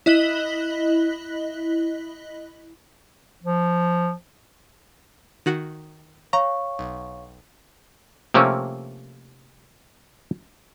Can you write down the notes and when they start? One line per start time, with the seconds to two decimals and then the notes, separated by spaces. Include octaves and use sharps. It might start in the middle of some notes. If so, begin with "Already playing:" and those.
0.06 E4 D#5 F#6 B6 F#7 G7
3.43 F3
5.46 D#3 F#4
6.33 C#5 F5 A#5 C#6
6.79 B1
8.34 C3 F3 A3 A#3 C4 C#4